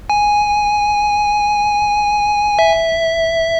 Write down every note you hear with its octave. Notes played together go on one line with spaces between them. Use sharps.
G#5
E5